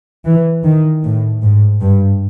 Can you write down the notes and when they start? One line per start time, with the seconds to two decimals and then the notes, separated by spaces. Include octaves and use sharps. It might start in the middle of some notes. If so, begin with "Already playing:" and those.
0.25 E3
0.64 D#3
1.04 A2
1.42 G#2
1.81 G2